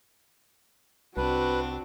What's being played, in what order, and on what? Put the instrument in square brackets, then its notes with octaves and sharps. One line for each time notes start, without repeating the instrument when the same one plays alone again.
[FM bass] C2 [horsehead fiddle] C4 F#4 [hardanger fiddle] D4 [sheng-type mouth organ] B4